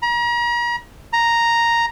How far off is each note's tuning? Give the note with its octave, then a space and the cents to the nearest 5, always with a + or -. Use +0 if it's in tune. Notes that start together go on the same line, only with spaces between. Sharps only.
A#5 +40
A#5 +0